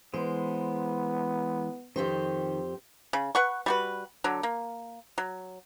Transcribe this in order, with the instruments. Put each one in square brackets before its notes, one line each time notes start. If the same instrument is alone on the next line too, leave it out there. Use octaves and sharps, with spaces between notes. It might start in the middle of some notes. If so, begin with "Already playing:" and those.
[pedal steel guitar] E3 G#3 [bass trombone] B3 [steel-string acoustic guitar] C5
[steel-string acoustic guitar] F2 G4 C5 [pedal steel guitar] D#3
[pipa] C#3
B4 F#5 C#6
G3 F#4 B4
D3 F#3
A#3
F#3